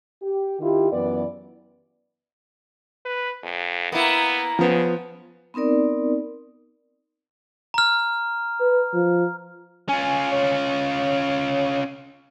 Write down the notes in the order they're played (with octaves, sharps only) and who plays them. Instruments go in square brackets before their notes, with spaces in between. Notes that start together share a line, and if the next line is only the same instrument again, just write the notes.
[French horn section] G4
D#3 E4 F4 G4
F#2 E3 B3 B4 D5
[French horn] B4
F2
[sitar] A#3 E4 [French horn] B3
[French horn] C#3 [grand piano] F3 B3
[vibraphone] B3 C4 D#4 A#4 D5
[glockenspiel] A#5 F6
[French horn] B4
F3
[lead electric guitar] C#4 F4 [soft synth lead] G#5
[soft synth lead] C#5